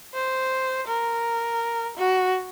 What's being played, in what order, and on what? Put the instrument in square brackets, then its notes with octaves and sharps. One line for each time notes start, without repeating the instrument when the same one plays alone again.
[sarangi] C5
A#4
F#4